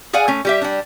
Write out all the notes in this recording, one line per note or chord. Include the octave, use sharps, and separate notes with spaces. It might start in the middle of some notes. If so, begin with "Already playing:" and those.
G#4 D5 F5 F#5 G#5
A3 C#4
G3 G4 E5
G3 D4